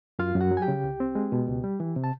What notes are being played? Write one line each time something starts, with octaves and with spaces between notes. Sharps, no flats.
F#2 F4 F5
F#2
F#4 F#5
F#3
G#5
G4 G5
C#3
C2
C4
G#3
B2
C#2
G3
E3
C3
A5